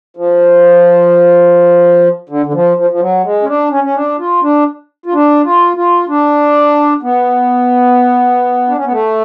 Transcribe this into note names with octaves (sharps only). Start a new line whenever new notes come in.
F3
D3
D3
F3
F3
F3
F#3
G#3
C#4
D4
C#4
C#4
D4
F4
D4
F4
D4
F4
F4
D4
B3
D4
C#4
B3
A3